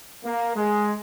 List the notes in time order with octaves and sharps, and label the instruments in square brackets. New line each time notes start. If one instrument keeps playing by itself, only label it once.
[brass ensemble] A#3
G#3